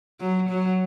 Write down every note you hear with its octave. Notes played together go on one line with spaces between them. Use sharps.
F#3
F#3